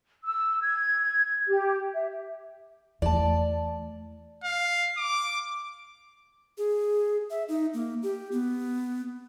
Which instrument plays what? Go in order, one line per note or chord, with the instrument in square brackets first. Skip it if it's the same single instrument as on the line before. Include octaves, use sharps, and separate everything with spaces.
[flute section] E6
G#6
G4
E5
[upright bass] E2 A3 [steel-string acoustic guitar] D5 A5
[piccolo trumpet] F5
D6
[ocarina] G#4
E5
D#4
A#3
G4
B3